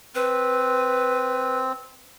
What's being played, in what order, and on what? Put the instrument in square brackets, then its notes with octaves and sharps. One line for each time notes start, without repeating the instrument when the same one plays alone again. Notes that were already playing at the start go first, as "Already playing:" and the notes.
[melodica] C4 [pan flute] B4